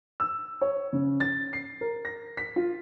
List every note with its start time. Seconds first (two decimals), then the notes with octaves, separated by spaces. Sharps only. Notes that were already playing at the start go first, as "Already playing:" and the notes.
0.20 E6
0.61 C#5
0.93 C#3
1.20 A6
1.53 C7
1.81 A#4
2.05 A#6
2.37 B6
2.56 F4